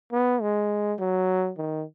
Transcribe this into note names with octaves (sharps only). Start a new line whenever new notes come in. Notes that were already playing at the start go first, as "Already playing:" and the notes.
B3
G#3
F#3
D#3